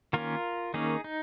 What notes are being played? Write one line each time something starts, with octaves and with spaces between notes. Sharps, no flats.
D#3 A#3 C#4 F4 A#4
D#3 A#3 C#4 D#4 G#4
D#4